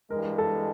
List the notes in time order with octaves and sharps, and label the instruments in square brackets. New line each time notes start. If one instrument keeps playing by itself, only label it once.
[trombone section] G2 E3 G#3 [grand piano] A#4
[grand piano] A4